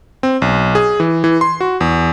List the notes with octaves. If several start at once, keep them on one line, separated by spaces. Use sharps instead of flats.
C4
B1
G#4
E3
E3
C6
F#4
E2